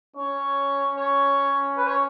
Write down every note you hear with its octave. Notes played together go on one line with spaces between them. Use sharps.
C#4 C#5
C#5
B4
C#5